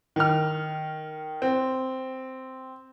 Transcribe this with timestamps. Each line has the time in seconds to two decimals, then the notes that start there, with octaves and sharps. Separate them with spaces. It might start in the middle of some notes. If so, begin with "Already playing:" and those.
0.16 D#3 F6
1.42 C4